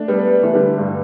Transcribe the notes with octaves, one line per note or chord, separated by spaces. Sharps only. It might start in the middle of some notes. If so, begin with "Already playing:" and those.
Already playing: A3 D4
G3 B3
E3 A3
D3 G3
G2